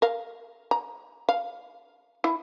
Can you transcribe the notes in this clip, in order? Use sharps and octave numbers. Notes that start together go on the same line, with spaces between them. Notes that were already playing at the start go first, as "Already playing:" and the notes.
A#4 F5
A#5
F5
E4